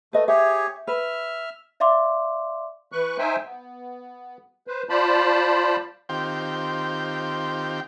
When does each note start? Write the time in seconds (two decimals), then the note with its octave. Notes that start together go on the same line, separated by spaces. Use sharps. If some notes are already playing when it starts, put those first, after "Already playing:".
0.13 A3 B4 D#5
0.28 G4 G#4 C#5 E5
0.87 B4 E5 F6
1.80 D5 E5 F5 C6 D6
2.92 E3 B4 C#6 F#6
3.18 D#4 C5 E5 G5 G#5
3.45 B3
4.67 B4 C5
4.89 F4 C5 D5 A5 B5
6.09 D#3 C4 F4 G4 G5